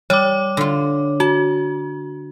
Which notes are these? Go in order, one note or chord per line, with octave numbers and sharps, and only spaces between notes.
G3 C#5 D6
D3 F4
F#4 A5